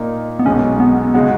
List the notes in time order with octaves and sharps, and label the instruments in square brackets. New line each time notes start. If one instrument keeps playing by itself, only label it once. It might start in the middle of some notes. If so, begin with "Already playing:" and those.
Already playing: [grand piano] A#2 A#3 D#4
[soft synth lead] B3
[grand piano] B1 B2 G#3 D#4 [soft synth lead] C#4
[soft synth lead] B3
[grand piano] C#3 G#3 D#4 F#4 [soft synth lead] B3